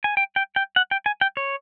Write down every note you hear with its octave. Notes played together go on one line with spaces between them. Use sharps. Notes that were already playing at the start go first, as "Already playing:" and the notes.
G#5
G5
G5
G5
F#5
G5
G#5
G5
C#5